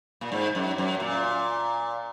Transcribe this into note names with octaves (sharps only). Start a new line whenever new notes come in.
A#2
G#2
F#2
F#2
A#2